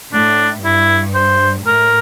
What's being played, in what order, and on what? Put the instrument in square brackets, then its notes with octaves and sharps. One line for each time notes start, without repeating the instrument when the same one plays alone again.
[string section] A2 [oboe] D4
[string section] G2 [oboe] E4
[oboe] C5
[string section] A2 [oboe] A#4